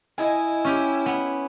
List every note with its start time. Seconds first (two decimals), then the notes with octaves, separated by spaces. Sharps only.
0.18 E4 D#5 G#5
0.65 C#4 G4
1.06 B3